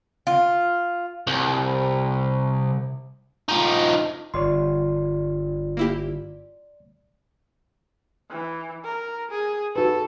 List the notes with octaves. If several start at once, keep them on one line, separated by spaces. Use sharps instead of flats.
F4
C2
F3 D#4
G1 F4 C#5 D5 C6
A#3 E4 G4
E3
A#4
G#4
F#4 A4 B4